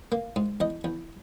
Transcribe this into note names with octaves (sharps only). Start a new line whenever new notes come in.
A#3
G#2
E2 D#5
E2